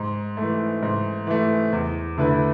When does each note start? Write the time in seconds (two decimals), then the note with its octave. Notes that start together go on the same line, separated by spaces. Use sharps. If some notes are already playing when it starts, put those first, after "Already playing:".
Already playing: G#2
0.37 E3 A3
0.82 G#2
1.27 E3 A3
1.73 E2
2.18 D3 A3 E4 B4